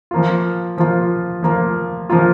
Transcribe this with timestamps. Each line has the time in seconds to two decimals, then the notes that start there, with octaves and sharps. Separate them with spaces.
0.11 F3 A#3 F4
0.78 F3 A#3 F4
1.43 F3 A#3 F4
2.10 F3 A#3 F4